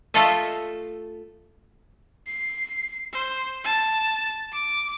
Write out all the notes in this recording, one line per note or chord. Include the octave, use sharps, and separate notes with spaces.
A3 F4 A4 D#5 E5
C7
C5
A5
D6